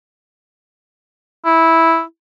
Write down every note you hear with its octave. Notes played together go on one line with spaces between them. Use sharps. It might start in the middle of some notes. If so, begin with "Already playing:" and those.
E4